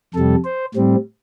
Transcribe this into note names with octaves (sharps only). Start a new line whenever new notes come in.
F2 C3 G3 A4
C5
A2 G3 C4